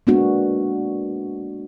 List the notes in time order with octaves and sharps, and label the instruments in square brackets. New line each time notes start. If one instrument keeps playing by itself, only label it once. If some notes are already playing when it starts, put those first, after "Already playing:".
[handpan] G#3 A#3 B3 D4 F#4